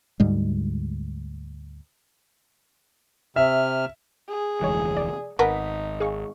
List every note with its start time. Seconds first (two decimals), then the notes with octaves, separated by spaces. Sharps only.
0.20 D2 G#2 G3 G#3
3.36 C3 E5 F6
4.29 G#4
4.61 F1 D2 E3 G3 G#3 C#5
4.97 D5
5.39 G#1 B3 D#4 A#4 B6
6.00 G#4 F5 C#6